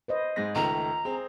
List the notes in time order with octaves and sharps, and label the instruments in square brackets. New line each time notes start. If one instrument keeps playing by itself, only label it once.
[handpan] B4 C5 D#5
[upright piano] G#2 G#3 A#6
[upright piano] C#2 D#3 A3 [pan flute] A#5
[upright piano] C4 [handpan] G#4